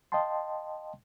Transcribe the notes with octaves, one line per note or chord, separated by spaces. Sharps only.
D#5 F5 G5 A5 C6